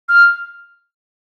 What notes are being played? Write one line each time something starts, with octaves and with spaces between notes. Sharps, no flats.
F6